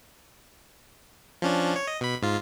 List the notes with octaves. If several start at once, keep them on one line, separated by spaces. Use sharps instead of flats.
F3 C#4 D4
C#5
D#5
B2 B5
G#2 F4